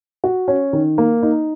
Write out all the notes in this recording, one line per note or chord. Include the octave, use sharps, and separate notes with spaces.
F#4
C#4
D#3
A#3
D#4